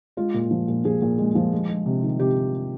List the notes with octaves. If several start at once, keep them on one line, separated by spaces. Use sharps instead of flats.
G#3 F4
A#2
F3
A#2
F3 G#4
A#2
G#3
F3
G#3
G#3
C3
D#3
C3 G4